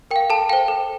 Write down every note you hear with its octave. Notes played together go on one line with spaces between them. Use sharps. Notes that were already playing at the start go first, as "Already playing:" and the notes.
A#4 G5
F5
A4 A5
C5 F5 G5
A4